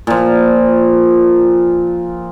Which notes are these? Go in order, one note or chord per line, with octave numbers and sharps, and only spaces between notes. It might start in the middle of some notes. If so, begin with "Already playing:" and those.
A#2 F3